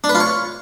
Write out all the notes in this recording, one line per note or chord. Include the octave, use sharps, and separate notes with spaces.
D4
B4
F4
C#5